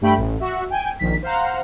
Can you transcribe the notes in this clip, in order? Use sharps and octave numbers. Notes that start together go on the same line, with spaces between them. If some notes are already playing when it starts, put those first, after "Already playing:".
G2 G3 A3 G5 B5
A1
F#4 E5
G5 G#5
A#1 D#3 B6
C5 F5 F#5 A#5